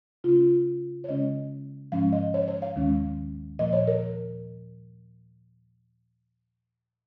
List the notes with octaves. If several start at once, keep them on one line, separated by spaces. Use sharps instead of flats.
C#3 A#3 C#4 F4
C#5
C#3 G#3 C#4 D#5
G#2 F3 G#3 C#4 F5
D#5
C#5
C#5
F5
D#2 D#3 G#3 C#4
A#2 F3 A#3 D#5
C#5
A#4